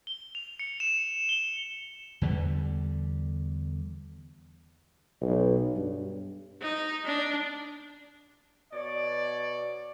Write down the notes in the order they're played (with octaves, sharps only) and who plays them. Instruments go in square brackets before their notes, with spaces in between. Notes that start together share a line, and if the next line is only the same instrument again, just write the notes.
[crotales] G7
F7
C#7
E7
G7
[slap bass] E2 D3 G3
[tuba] B1
G2
[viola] D#4
D4
[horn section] B2 C#5 D5